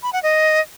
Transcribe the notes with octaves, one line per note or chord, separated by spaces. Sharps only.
B5
F#5
D#5